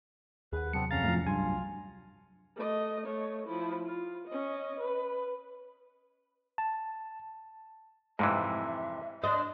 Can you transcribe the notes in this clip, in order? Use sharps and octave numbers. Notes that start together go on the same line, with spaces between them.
D#2 G#4 B4 F#5
C3 F#3 B3 C4 D4 C#7
F2 C#4 F5 A#5 A6
A2 F3
C2 G2 F#3 F4 G#5 C6
A3 D#5
A3 C#5
F3 E4
F4
C#4 D#5
B4
A5
F2 G#2 C3 E3 E5
D4 D#5 C6